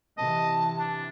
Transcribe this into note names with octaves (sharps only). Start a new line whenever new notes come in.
C3 E3 D#5 A5
D4